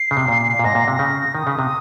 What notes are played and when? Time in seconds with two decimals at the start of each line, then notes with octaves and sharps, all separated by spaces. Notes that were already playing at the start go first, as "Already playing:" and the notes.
Already playing: C7
0.11 C#3
0.17 C3
0.28 A#2
0.59 A#2
0.64 G#2 A#6
0.75 A#2
0.88 C3
0.99 C#3
1.35 D#3 D#6
1.47 C#3
1.59 C3